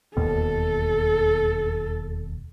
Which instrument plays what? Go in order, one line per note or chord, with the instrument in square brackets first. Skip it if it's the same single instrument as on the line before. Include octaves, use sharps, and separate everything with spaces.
[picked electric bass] E1 D#2 B2 [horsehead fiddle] A4